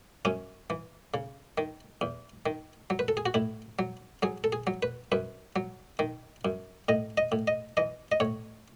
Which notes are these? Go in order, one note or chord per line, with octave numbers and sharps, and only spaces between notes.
F#2 C#4
E3
C#3
D#3
E2
D#3
F#3
B4
A4
G#4
F#4
A2 E4
F#3
F#3 G#4
A4
G#4
F#3
B4
F#2 B4
F#3
D#3
F#2
A2 D#5
D#5
A2
D#5
E3 D#5
D#5
A2 C#5